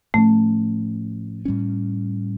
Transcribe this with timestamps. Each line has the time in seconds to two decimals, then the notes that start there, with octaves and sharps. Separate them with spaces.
0.14 A2 F3 A3 C#4
1.45 A2 G3 C#4